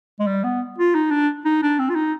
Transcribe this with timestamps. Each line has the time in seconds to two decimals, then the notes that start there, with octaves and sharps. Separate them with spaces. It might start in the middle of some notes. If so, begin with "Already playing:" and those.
0.20 G#3
0.27 G3
0.44 B3
0.78 F4
0.95 D#4
1.11 D4
1.45 D#4
1.63 D4
1.79 C4
1.90 F4
1.96 D#4